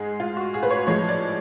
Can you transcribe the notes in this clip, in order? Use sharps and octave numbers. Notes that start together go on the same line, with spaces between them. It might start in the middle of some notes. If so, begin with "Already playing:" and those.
Already playing: G#2 G#3 G#4
F4
F#4
G#4
B4
C#5
A2 F3 G#3 C#5
D5